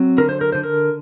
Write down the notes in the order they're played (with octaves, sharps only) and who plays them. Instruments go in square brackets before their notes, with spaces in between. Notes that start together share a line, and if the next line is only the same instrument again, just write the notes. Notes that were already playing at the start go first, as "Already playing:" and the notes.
Already playing: [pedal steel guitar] F#3 C4
D3 A#4
C5
A#4
D3 C5
A#4